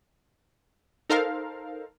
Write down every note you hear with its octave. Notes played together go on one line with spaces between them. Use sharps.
D#4 A4 A#4 C5 F5